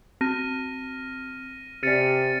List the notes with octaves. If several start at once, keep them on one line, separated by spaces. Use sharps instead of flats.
C4 F6 A#6 D#7
C3 D5 F6 A6 C#7 D#7